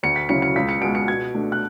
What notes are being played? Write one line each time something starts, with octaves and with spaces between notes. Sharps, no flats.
D2 C#7
B6
C#3 F#3 C#4 E4 C#7
C#7
C#2 B6
C#7
B2 G#3 D7
C#7
B2 G#6
A3 D4
F#6